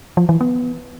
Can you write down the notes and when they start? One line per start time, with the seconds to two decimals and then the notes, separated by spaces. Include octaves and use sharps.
0.17 F3
0.29 E3
0.41 B3